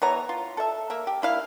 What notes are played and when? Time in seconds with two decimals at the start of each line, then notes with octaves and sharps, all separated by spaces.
0.02 E3 B3 C#5 A#5
0.29 F4
0.57 A4 E5
0.90 A#3 E5
1.07 G4
1.22 A#3 E4 F5